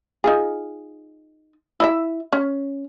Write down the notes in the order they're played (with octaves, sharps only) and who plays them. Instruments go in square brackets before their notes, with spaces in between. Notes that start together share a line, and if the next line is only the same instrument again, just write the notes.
[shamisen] D#4 F4 G#4
E4 D#5 E5
C#4